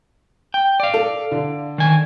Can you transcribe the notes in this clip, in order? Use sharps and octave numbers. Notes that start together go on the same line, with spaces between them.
G5
D5 F5
A4
D3
D#3 G#5